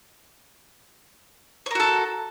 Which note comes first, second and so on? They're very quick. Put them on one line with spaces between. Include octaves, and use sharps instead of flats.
C#5 A#4 F#4 A4